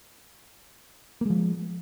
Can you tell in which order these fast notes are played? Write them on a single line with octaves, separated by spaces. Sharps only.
A#3 G#3 F3